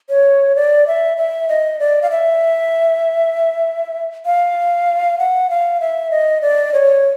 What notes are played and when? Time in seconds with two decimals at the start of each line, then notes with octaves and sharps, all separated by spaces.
0.10 C#5
0.56 D5
0.87 E5
1.17 E5
1.49 D#5
1.79 D5
2.02 F5
2.10 E5
4.26 F5
5.19 F#5
5.50 F5
5.80 E5
6.11 D#5
6.42 D5
6.73 C#5